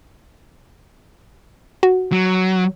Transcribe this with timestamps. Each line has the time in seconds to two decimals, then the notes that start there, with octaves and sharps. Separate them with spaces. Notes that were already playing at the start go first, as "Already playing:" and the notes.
1.83 F#4
2.12 F#3